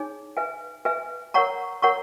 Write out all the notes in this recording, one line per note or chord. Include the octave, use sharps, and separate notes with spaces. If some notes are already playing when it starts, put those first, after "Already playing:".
Already playing: D#4 G#4 C#5 G#5
B4 E5 G#5
B4 E5 G#5
A#4 C#5 F#5 A#5 C#6
A#4 C#5 F#5 A#5 C#6